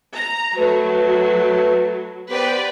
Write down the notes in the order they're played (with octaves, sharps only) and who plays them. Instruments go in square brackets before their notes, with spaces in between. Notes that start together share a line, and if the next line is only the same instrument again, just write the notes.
[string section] A#5
[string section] F#3 [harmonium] A3 A5 [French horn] B4
[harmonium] B3 G4 C5 [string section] B4 D5 G5